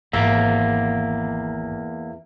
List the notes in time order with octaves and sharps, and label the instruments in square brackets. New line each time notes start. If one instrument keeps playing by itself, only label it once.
[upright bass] G#1 [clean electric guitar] E2 A#3 [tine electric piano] E5